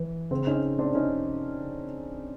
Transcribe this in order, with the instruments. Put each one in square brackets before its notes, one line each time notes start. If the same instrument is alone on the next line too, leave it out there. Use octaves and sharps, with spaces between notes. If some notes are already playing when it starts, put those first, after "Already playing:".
Already playing: [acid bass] E3
[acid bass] C#3 [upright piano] C4
[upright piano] C#4 D#4
C4 D4
[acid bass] C3 [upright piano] C#4 D#4
[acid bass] C#3